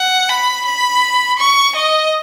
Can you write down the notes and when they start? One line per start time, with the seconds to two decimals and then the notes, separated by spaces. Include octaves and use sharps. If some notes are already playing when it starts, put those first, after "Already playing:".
Already playing: F#5
0.29 B5
0.65 B5
1.39 C#6
1.75 D#5